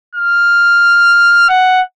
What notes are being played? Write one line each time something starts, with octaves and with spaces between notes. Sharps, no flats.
F6
F#5